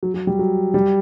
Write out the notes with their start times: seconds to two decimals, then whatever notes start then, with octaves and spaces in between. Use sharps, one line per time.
0.03 F#3
0.14 F#3
0.27 G3
0.39 F#3
0.74 G3